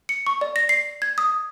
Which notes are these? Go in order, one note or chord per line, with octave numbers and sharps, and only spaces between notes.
C#7
C#6
D5
A#6
C7
G#6
D#6